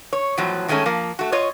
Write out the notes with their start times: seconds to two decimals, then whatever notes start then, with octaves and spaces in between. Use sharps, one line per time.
0.13 C#5
0.37 E2 A2 F3 F#3
0.68 D#3 F#3 G#3 A3 C#4
0.86 F3 A#3
1.19 A3 F#4
1.32 F4 C#5 D#5